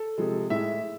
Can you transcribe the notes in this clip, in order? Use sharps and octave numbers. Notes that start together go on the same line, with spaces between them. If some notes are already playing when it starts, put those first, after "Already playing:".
Already playing: A4
C3 F3 G#3
A2 G#3 E5